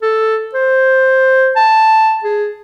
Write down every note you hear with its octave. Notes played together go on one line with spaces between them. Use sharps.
A4
C5
A5
G#4